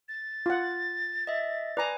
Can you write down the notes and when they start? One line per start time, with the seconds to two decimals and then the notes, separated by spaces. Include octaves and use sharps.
0.09 A6
0.46 F4 F#5
1.27 D#5 E5
1.77 B4 D5 G#5 A#5